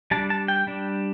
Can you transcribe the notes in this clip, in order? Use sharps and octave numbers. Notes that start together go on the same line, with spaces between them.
G3 D4 A5
A5
G5
G3 D4